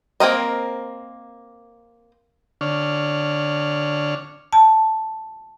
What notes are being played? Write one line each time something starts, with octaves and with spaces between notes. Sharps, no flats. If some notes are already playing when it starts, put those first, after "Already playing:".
A#3 C4 A#4 D#5
D3 D4 C#5 F6
A5